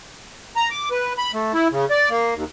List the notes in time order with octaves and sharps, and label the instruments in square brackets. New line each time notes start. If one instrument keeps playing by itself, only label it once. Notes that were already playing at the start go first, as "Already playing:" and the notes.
[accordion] A#5
D6
B4
B5
A3
E4
C#3
D5
A#3
D#2